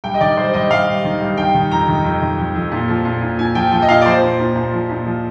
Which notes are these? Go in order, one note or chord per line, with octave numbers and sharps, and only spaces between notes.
G2 G5
D#5
D#3 D5
G2 C5
G2 D#5
G2 F5
G2
D#3
G2
D#3 G5
D#3
F2 A#5
D#3
F2
D#3
F2
F2
A#2
F3
A#2
A#2
A#2 G#5
F3 G5
F3 G5
D#5
A#2 F5
D5
F3 C5
A#2
A#2
A#2
F3
A#2
F3